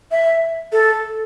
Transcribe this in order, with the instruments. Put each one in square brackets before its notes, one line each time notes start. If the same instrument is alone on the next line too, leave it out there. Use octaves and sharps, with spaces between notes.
[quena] E5
A4